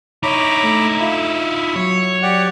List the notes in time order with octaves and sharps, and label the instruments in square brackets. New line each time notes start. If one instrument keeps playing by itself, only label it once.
[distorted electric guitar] D#4 E4 [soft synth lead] C#5 [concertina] A#5 B5 D6
[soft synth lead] A3
[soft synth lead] F4 [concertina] E5 B5
[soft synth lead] F#3 [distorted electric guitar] C#5
[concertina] G4 D5 F#5